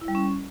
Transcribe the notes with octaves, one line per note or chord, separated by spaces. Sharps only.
E4
G3
C#4